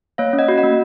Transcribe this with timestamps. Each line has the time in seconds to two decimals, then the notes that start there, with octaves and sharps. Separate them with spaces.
0.18 A#3 C#5 F5
0.33 C#4
0.39 D#5 F#5
0.48 F#4
0.58 D#5 F#5
0.64 A#3